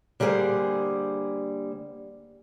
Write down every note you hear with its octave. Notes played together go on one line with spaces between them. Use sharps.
D3 G3 A#3 G#4 C5